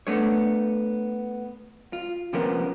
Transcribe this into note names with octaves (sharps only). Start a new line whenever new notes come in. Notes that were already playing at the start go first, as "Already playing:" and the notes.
A3 B3 D4 C#5
F4
C3 F3 A#3 B3 C#4 A#4